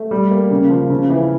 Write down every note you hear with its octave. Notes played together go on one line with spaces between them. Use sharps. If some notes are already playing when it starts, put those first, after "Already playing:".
Already playing: A3
G3
A#3
C#3
F3
C#3
E3